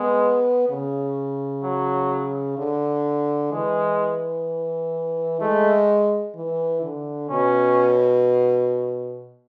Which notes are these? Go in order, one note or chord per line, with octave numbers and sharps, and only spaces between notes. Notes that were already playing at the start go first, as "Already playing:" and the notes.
Already playing: G#3 B3
C#3
F#3
D3
E3 G#3
G#3 A3
E3
D3
B2 C#4